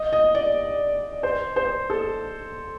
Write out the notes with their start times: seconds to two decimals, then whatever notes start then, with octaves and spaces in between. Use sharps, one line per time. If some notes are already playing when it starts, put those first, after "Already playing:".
Already playing: D#5
0.13 D#5
0.35 D5
1.23 C5
1.56 C5
1.90 A4